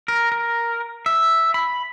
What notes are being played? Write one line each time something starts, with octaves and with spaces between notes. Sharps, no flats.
A#4
A#4
E5
B5